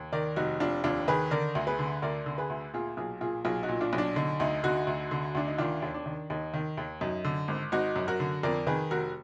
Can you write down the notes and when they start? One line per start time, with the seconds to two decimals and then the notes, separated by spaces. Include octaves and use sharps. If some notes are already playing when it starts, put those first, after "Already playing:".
Already playing: D#2
0.13 D#3 A#4 D5
0.36 F1 D#4 F#4
0.60 F1 D4 F4
0.84 D#2 D4 F4
1.08 D#3 G#4 B4
1.31 D3 A#4 D5
1.55 D2
1.67 G#4 B4
1.79 D3
2.02 D2 A#4 D5
2.26 D3
2.38 G#4 B4
2.50 D2
2.73 A#2 F4 G#4
2.97 B1 F4 G#4
3.21 A#2 F4 G#4
3.45 B1 F4 G#4
3.63 D#4 F#4
3.69 A#2
3.81 D4 F4
3.93 B1
3.98 D4
4.16 D3 D#4
4.40 D2 D#4
4.63 D3 D#4 F#4
4.87 D2
5.11 D3
5.35 D2 D4
5.47 D#4
5.58 D#3 D4 F4
5.82 D#2
5.94 D4
6.06 D#3
6.30 D#2 D#4
6.54 D#3
6.77 D#2
7.01 F#2 D#4
7.25 D3
7.48 G#1
7.72 G#1 D#4 F#4
7.96 F#2
8.08 F#4 A#4
8.20 D3
8.43 F2 A#4 D5
8.67 D#3 G#4 B4
8.91 F1 F#4 A#4